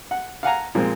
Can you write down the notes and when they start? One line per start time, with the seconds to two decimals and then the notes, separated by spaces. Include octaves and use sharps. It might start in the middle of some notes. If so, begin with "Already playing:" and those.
0.11 F#5
0.43 F5 F#5 G#5 A#5
0.75 A#2 F3 G#3 C4